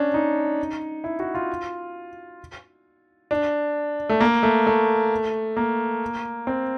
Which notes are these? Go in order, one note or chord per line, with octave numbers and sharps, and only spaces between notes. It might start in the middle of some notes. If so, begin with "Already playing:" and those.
Already playing: C#4 D4
D#4
E4
F#4
F4
D4
A3
A#3
A3
A3
A#3
C4